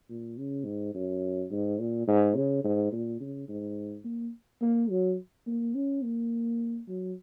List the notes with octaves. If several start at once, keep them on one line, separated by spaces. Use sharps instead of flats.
A#2
C#3
G#2
F#2
G#2
A#2
G#2
C#3
G#2
A#2
C#3
G#2
A#3
A#3
F#3
A#3
C#4
A#3
F#3